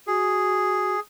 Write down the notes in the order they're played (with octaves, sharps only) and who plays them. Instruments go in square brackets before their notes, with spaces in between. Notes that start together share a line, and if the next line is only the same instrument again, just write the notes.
[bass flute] F#4 [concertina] G#4